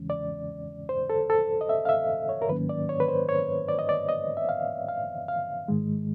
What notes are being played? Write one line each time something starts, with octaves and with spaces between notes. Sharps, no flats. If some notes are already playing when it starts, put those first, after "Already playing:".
Already playing: E2 C#3 E3 G#3 C#4
D5
C5
A4
A4
D#5
E5
F5
E5
C#5
A#4
G#2 D#3 F#3 A#3 C#4 B4
D5
C#5
B4
C5
C#5
D5
D#5
D5
D#5
E5
F5
F5
F5
G#2 D#3 G#3